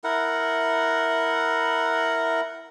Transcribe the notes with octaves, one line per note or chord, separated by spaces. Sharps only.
E4 A#4 F#5